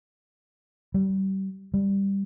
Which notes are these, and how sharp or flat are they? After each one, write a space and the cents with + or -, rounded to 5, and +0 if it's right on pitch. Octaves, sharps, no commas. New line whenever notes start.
G3 -30
G3 +10